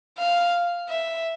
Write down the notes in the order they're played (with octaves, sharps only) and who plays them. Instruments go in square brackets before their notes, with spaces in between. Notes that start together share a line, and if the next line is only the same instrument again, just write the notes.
[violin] F5
E5